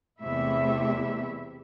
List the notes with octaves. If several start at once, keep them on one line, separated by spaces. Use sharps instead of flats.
E2 C3 G#3 A3 E4 E5